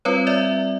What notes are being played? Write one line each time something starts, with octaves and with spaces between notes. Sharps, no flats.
G3 C4 F4 B4 C#5
D5 E5